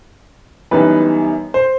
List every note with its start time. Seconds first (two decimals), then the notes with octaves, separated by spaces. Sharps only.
0.71 F#2 E3 G3 B3 D#4 B4
1.54 C5